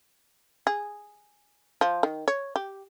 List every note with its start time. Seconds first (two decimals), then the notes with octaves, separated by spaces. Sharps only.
0.67 G#4
1.81 F3
2.03 D#3
2.28 C#5
2.56 G4